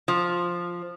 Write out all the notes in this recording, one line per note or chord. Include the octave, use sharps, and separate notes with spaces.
F3